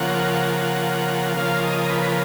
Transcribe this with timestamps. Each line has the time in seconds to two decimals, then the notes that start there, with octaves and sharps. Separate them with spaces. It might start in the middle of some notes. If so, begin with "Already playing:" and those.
Already playing: C#3 F3 A#3 F#5
0.57 F#5
1.36 C#3 F3 A#3 F5
1.63 D#5
1.89 B4